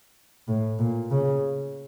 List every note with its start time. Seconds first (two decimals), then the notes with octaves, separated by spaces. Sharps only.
0.48 A2
0.79 A#2
1.11 C#3